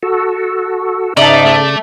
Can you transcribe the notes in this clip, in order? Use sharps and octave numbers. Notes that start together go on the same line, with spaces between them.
F#4 A4
G#2 C#3 D#4 D5 E5 A5
A3